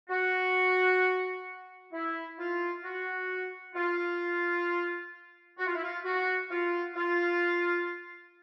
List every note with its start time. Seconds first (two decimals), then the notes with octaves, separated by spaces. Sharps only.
0.09 F#4
1.92 E4
2.39 F4
2.84 F#4
3.75 F4
5.58 F#4
5.66 F4
5.75 E4
5.83 F4
6.04 F#4
6.50 F4
6.95 F4